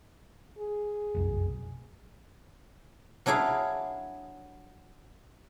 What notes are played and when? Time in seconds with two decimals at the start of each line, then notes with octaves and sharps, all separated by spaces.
0.59 G#4
1.15 F1 B1 F#2
3.26 F#3 D4 E4 G#4 F5